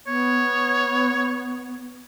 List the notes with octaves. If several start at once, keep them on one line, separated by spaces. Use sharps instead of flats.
B3 C#5